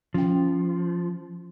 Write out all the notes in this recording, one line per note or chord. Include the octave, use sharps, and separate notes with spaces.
F3 C#4 G5